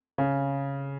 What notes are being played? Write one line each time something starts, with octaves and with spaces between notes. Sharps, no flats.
C#3